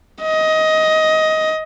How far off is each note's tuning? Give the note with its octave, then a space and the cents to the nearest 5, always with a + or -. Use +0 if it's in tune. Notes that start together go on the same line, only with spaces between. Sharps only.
D#5 +15